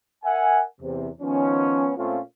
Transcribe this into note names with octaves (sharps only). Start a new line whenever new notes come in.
A#4 E5 F#5 G#5
E2 C3
D#3 F3 B3 C#4
A#2 A3 C4 C#4 F4